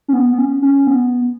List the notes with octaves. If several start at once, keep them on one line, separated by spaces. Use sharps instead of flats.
C#4
B3
B3
C#4
C#4
B3